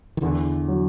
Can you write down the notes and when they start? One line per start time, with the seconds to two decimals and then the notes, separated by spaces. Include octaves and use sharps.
0.17 D#3
0.22 E2 D3 E3
0.68 F#3